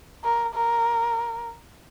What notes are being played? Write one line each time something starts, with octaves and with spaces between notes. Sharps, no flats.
A#4
A#4